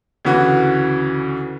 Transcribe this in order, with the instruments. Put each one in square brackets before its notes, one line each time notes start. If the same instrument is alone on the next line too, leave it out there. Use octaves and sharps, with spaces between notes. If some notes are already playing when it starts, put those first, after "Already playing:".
[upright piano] D2 C#3 E3 F#4